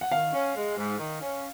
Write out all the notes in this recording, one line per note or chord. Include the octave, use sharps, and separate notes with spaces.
F#5
D#3 F5
C#4
G#3
G#2
D#3
C#4